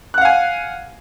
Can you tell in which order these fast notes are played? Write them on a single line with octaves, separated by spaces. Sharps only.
F#6 F#5 F5 G#5